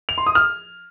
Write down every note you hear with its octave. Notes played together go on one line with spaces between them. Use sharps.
F7
C6
D#6
F6